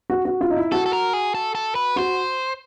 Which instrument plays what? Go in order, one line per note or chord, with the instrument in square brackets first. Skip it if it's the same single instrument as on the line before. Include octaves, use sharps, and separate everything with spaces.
[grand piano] F#4
F#4
F4
D#4
E4
[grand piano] F#4 [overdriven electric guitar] A4
[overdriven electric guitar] A4
A#4
G#4
A4
A4
B4
[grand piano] F#4 [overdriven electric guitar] C5